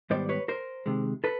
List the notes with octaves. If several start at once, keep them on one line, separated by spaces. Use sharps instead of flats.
G#2 D#3 G3 B3 C5 D5
B4 C#5
A#4 C5
C3 D#3 G#3
A4 B4